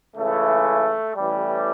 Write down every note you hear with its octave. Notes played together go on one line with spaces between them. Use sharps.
C#2 C#3 E3 A3
A1 A2 E3 G3